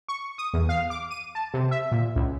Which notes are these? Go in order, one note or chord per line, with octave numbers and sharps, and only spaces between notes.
C#6
D#6
E2
F5
D6
D#7
A5
C3
E5
A#2
C#2